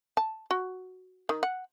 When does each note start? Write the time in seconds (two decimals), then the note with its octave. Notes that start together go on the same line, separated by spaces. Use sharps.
0.17 A5
0.51 F#4
1.29 D#3
1.43 F#5